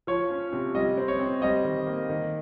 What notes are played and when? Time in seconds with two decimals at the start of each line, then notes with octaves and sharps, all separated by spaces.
0.07 F3 C#5
0.30 C#4
0.53 C3
0.75 G3 D#5
0.97 C4
1.08 C#5
1.20 C4
1.42 G3 D#5
1.64 D#3
1.87 A#3
2.09 D#3